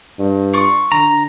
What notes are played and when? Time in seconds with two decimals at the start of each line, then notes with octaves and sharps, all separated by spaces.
0.19 G2
0.53 F4 C#6 D6
0.92 D3 A#5